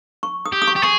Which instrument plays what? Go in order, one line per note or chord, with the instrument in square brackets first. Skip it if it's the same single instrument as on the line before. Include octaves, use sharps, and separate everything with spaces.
[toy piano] C#6
D#6
[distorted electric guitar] G4
[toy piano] D#6
C#6
[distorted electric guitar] G4
[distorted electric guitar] G#4 [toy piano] C#6